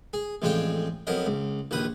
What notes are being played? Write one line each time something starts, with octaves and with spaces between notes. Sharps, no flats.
G#4
A1 F2 G#3 F4 D5 G5
F2 F#3 B3 A#4 D#5
C#2
A#1 D#2 B4 D#6